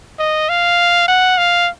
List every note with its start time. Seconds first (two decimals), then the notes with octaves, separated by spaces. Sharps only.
0.19 D#5
0.49 F5
1.08 F#5
1.38 F5